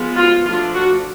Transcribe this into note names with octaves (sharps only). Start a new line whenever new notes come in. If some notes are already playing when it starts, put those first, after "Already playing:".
Already playing: F3 G#3 B3
F4
F3 A3 D4 F4
F#4